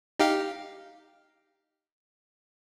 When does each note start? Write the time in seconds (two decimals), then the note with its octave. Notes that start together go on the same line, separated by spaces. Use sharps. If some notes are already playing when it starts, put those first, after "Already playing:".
0.19 D#4 G4 F5